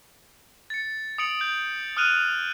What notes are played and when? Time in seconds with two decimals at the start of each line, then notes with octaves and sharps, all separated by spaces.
0.70 A6 C#7
1.18 D#6 C#7 D7 F#7
1.40 G6 D7
1.97 D#6 F6 F#6 D#7 F7